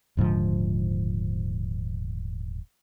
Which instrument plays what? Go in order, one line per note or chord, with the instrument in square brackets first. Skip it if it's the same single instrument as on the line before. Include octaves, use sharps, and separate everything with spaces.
[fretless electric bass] D#1 G#2 D3 F3